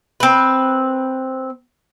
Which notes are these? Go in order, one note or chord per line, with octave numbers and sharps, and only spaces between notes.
C4 B4